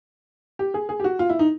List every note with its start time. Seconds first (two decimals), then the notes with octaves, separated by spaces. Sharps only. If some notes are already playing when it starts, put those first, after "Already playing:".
0.59 G4
0.74 G#4
0.89 G#4
1.00 G4
1.04 F#4
1.19 F4
1.30 E4
1.39 D#4